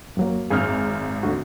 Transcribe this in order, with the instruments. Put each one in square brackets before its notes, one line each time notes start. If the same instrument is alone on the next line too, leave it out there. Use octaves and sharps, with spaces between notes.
[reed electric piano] F#2 F#3 A#3
[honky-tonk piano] G#1 F#2 F6 [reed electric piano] G#4
[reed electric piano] D2 D3 F#4